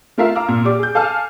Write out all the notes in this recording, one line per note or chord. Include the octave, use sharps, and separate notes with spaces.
A3 F4 A#4 E5 F5
F5 A#5 D6 E6 F6
A#2
G4 D5 D6
G#4 G6
A4 F5 G#5 A5 F6